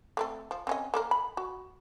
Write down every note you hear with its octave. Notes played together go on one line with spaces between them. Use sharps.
A3 C4 A4
F3
C4 C#4 D#5
A#3 A4 A#4
B5
F#4